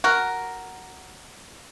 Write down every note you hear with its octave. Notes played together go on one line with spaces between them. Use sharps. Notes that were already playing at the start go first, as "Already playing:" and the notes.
F#4 A#4